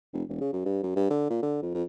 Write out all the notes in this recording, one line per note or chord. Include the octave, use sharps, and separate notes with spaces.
F1
E1
C#3
F#2
G2
F#2
G2
D3
A#2
D3
F2
F2